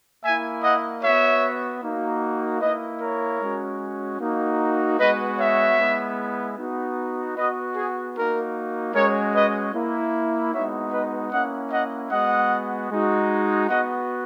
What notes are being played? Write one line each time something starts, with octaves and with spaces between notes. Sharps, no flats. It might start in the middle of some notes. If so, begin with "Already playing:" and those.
A#3 E4 E5 G#5
D#5 F#5
B3 F#4 C#5 E5
A#3 D#4 F#4
A#3 E4 B4 D#5
A#4 C#5
G#3 C#4 F#4
A#3 D#4 F#4
G#3 B3 F#4 B4 D#5
C#5 E5
G#3 B3 E4
B3 D#4 F#4
B3 F#4 B4 D#5
G#4
A#3 D#4 F#4 A#4
G#3 C#4 F#4 A#4 C#5
B4 D#5
A#3 E4
G#3 B3 D#4 F#4 C#5 E5
B4 D#5
A#3 C#4 E4 D#5 F#5
D#5 F#5
G#3 B3 F#4 D#5 F#5
G#3 D#4 F#4
B3 F#4 D#5 F#5